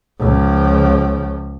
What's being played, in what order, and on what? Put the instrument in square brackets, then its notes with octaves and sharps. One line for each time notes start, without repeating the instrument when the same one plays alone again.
[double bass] C#2 F3